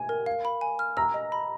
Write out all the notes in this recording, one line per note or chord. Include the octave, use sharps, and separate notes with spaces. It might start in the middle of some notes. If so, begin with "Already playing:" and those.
Already playing: G#5
A#4
F5
B5
G#5
F6
A#5 E6
D#5
B5